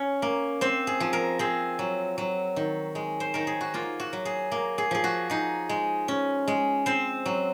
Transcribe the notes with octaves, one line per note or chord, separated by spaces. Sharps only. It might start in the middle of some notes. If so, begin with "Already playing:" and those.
Already playing: C#4 C#5
A#3
C4 C5
G#4
F3
A#4
C4 G#4
F#3
F#3
D#3
G#3
C5
D#3 A#4
G#4
F#4
A#3 F4
F#4
F#3
G#4
A#3
G#4
F3 G#4
F#4
D#4 G#4
G#3
C#4
G#3
C4 C5
F#3